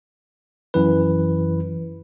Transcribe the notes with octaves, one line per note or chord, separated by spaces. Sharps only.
F#2 E3 B4